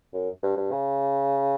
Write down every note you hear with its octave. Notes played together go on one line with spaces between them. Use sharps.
F#2
G2
G2
C#3